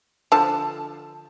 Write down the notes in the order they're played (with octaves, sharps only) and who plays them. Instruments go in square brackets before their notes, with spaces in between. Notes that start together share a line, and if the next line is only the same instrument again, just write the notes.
[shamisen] D3 F3 A5